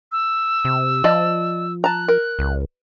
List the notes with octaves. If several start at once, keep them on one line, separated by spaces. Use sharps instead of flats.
E6
C3
F3 D5 D#5 A5
A5 A#5 F#6
A#4
C#2